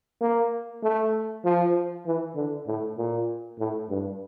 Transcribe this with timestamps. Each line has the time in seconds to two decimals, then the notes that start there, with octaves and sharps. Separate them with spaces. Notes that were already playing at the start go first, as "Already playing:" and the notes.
0.21 A#3
0.83 A3
1.44 F3
2.06 E3
2.35 D3
2.67 A2
2.98 A#2
3.59 A2
3.89 G2